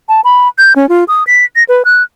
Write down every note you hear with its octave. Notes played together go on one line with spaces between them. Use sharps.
A5
B5
G6
C#4
F4
D#6
B6
A#6
B4
F#6